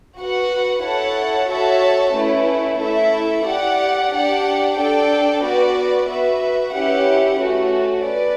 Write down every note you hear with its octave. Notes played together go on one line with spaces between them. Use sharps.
F#4 B4 F#5
E4 A4 C#5 F#5 A5
F#4 A4 C#5 E5 A5
A3 C#4 E4 B4
A3 E4 A4 E5
G4 D5 F#5
D4 G4 D5 F#5
D4 A4 D5 G5
B3 F#4 B4 D5
F#4 B4 E5
C#4 E4 G4 B4 F#5
A3 C#4 F#4
B4 D5